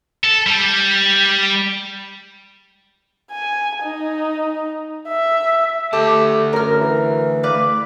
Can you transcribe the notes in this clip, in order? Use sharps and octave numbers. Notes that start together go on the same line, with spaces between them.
A4
G3
G#5
D#4
E5
D2 A3 G4 A5
F#2 A#4 F6
E3
B4 D5 F5